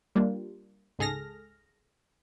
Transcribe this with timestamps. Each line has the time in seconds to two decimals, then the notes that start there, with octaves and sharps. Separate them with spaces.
0.15 G3 A#3 D4 F4
0.99 C#2 G#2 G#4 A4 F6 A#6